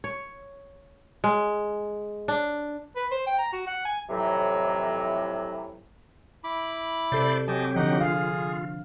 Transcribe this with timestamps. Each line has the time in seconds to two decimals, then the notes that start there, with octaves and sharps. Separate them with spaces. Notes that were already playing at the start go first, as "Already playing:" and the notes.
0.04 C#5
1.24 G#3
2.28 D4
2.96 B4
3.11 C5
3.27 G5
3.38 A#5
3.53 F#4
3.67 F#5
3.85 G#5
4.09 F2 A2 C3 E3 F#3
6.44 E4 B5 D6
7.12 C3 A4 C5 D5
7.48 F#3 C4 G4 D#5 G#5 A5
7.76 D3 F3 D#4 D#5 F#5
8.00 F4 G#4 F5